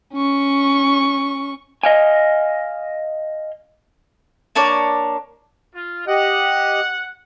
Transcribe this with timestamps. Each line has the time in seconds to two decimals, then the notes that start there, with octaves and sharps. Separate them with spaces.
0.14 C#4 C#6
1.83 D#5 F5 G#5
4.55 A#3 D4 C#5 D5
5.75 F4
6.08 G4 D#5 F#5